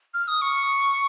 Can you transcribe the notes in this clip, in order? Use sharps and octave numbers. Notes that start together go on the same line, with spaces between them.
F6
D#6
C#6